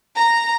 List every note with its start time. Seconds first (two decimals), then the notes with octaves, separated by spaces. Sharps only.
0.18 A#5